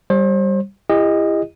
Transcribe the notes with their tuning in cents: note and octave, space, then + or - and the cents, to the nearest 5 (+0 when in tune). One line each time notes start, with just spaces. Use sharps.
G3 +0 C5 +35
E4 +25 G4 +45 D#5 +0